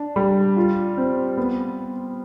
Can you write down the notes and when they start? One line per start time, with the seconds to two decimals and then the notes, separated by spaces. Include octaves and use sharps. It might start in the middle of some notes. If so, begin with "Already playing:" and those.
Already playing: D4
0.16 G3
0.57 F4
0.97 C4
1.37 B3